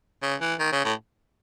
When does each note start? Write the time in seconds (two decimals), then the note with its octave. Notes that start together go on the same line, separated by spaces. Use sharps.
0.22 C#3
0.41 E3
0.59 D#3
0.72 C#3
0.85 A2